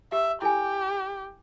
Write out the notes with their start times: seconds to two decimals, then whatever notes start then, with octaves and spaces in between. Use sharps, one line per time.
0.12 G4 E5
0.42 E4 G4 A4 G#5